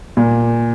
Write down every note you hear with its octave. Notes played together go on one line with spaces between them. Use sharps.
A#2